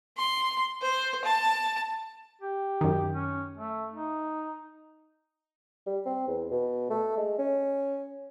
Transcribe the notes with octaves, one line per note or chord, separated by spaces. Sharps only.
C6
C5
A5
G4
F#2 D#3
C#4
A3
D#4
G3
C4
E2
B2
A3
G#3
C#4